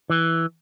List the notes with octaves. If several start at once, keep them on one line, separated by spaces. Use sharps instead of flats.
E3